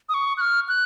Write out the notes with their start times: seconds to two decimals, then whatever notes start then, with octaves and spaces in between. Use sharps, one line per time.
0.09 D#6
0.14 C#6
0.37 F#6
0.41 F6
0.68 F#6